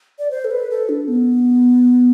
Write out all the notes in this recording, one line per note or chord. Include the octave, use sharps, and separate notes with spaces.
D5
C5
A4
B4
A4
D4
B3